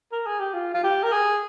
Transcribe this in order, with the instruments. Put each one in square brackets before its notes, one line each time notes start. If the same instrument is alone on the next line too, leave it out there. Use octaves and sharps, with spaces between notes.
[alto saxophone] A#4
G#4
G4
F4
F4
G4
A#4
G#4